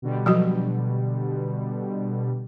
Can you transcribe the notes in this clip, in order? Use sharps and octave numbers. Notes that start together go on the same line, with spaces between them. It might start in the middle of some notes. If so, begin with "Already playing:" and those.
B2 D3 G3
F3 F#3 F#4